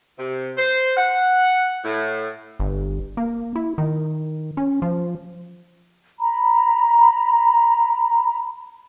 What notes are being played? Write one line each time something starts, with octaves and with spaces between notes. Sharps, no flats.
C3
C5
F#5
A2
G1
A#3
E4
D#3
C#4
F3
A#5 B5